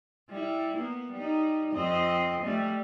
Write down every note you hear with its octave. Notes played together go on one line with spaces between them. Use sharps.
G3 E4
A#3 B3
G3 D#4
F2 C4 D#5
G3 A3